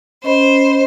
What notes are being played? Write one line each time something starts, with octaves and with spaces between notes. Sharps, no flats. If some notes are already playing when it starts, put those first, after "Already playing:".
C#4 C5 D#5 B5